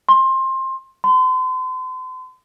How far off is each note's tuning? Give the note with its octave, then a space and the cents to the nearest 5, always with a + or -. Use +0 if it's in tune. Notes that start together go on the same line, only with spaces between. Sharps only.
C6 +20
C6 -40